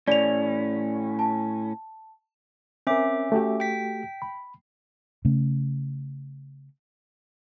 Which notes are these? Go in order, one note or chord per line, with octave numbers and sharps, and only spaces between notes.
A2 C#4 D5 F7
A5
C4 C#4 A#4 E5 D6
A3 F#4 G4
G5 B6
B5
C#3 A3 C#4